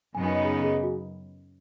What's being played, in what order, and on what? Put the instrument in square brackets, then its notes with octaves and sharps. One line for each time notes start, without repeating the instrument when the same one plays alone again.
[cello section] F#2 C#3 B3 D#4 [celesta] G#5
[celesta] G#5
D#5
G#4
G#4
G#4
F#4